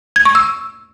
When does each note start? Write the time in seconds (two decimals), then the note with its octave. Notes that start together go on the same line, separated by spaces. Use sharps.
0.16 G#6
0.25 C#6
0.35 E6